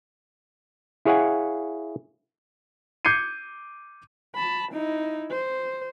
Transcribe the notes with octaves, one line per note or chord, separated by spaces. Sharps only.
E4 G#4 C#5 F5 F#5 G#5
D6 G6 G#6 C7 C#7 D#7
A5 B5
D#4 E4
C5